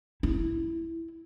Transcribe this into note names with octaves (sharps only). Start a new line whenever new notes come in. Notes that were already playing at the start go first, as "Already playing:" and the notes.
E4